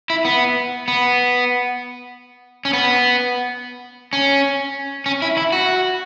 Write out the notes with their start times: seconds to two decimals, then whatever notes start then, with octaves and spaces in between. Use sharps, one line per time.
0.10 E4
0.25 B3
0.88 B3
2.65 C#4
2.73 B3
4.13 C#4
5.06 C#4
5.22 E4
5.37 E4
5.52 F#4